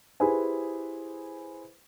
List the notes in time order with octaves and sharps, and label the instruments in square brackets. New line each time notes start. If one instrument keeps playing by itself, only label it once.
[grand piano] E4 G4 G#4 B4 C5 G#5